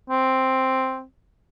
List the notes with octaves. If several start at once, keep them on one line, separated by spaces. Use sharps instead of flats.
C4